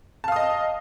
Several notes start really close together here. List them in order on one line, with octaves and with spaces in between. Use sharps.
A5 F5 D#6 D#5